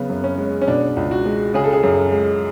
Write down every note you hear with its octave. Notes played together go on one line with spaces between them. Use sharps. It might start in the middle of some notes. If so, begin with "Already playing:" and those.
Already playing: C#3 F#3 B3
F#2
C#4
G#3
C#4
B2 D4
C#2
F#4
G#3
C#3 G#4
A4
G#4
F#2
G#3